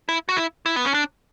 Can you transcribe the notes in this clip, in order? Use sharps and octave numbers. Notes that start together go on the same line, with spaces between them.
E4
F#4
E4
E4
B3
C#4
D4